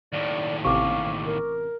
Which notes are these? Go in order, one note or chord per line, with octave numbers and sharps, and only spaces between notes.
D#2 A2 D5
A1 C3 F5 C#6 D6
A#4